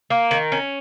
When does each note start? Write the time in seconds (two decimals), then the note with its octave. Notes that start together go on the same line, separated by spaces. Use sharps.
0.10 A#3
0.31 D#3
0.52 C#4